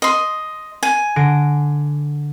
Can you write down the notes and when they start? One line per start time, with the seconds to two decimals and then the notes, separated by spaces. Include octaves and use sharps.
0.02 D#5 C6
0.83 G#5
1.16 D3 A#6 D7